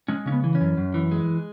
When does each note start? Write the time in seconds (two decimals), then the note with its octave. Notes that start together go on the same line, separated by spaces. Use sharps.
0.08 G#3 C#4
0.26 C#3 C#4
0.32 B3
0.44 E3
0.55 C#4
0.61 F#2
0.77 F#2
0.94 E3
1.12 G#3